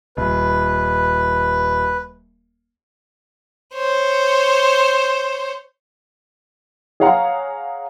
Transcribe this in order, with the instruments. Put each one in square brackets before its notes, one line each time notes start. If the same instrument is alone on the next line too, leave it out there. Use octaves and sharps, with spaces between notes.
[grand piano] D#1 [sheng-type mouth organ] B4
[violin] C5 C#5
[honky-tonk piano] G#4 C#5 F5 F#5 A#5